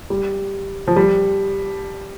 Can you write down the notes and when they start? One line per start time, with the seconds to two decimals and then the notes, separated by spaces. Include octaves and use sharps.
0.10 G3
0.87 F3
0.96 G3